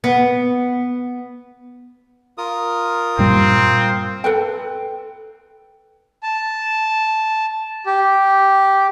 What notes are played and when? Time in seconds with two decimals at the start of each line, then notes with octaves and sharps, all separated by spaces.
0.04 B3
2.38 F4 A#4 D#6
3.19 G2 A#2 G3 C4
4.24 A4 B4 G5
6.23 A5
7.86 G4